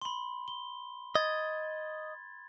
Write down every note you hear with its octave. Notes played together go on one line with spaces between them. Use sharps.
B5 C6
G7
D#5 G#6 A6